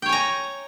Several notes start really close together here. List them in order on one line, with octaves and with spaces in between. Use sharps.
G5 C#5 G#5 A#5